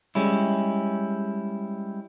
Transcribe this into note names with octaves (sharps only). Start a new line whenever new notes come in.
G3 G#3 C#4 E4